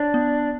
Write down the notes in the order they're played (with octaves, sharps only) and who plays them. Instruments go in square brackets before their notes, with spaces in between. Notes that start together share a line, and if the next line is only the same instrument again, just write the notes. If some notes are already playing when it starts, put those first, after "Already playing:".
Already playing: [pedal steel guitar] D4 [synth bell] C#5
[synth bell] B3